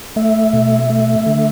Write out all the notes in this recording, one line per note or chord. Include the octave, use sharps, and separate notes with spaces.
A3 E5
B2
A3
D3